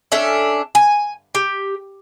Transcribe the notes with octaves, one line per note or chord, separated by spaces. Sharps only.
C#4 D4 A4 E5
G#5
G4